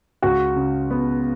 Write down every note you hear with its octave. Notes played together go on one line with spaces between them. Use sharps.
C#2 F#4
C#3
B3